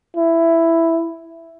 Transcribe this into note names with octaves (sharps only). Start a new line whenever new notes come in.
E4